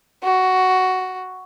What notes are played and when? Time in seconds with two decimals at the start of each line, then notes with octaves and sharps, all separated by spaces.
0.24 F#4